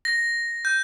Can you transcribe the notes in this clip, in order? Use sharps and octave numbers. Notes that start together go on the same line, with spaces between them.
A#6
G6